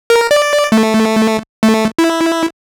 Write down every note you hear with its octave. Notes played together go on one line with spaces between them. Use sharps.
A#4
D5
A3
A3
E4